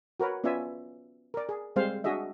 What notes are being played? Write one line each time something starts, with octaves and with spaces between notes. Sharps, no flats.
F#4 A#4 B4 C#5
B3 C#4 F4 D5 E5 G#5
A#4 D5
G#4
G3 G#3 C4 C5 F5
D4 F#4 G#4 D#5 E5